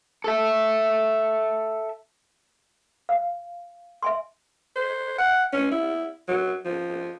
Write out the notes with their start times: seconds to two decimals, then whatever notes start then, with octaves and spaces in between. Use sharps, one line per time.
0.24 A4 E5
3.09 F5
4.03 E5 G#5 C6
4.75 C5
5.18 F#5
5.53 C#4
5.71 E4
6.28 F#3
6.65 F3